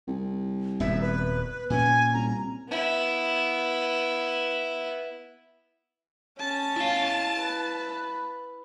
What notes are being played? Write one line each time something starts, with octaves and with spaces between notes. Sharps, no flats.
C2
D#1 F#2 B3 E5
B4
A#2 C#4 G#5
C2 A#5
B3 E4
C#4 A5
E4 F5
B4